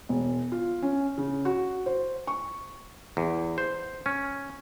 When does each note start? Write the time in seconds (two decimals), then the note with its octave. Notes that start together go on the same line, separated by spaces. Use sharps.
0.09 E1
0.52 F4
0.82 C#4
1.18 C#3
1.45 F#4
1.86 C5
2.27 C#6
3.17 E2
3.58 C5
4.06 C#4